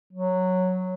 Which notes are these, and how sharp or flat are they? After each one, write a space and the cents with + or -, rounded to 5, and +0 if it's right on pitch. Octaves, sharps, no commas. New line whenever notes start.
F#3 -5